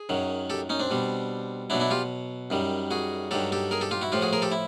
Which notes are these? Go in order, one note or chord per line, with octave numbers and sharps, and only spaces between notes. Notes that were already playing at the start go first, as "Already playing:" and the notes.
Already playing: G#4
F#2 D#3 F#3
G4 A4
C#4 D#4
C4 D4
B2 G3
B2 F#3 D4 E4
D4 E4
F4 G4
F#2 D#3 G3
F#4 G#4
G2 D#3 F#3 G4 A4
G4 A4
G#4 A#4
G4 A4
F4 G4
E4 F#4
A2 F3 F4 G4
F#4 G#4
G#4 A#4
G4 A4
E4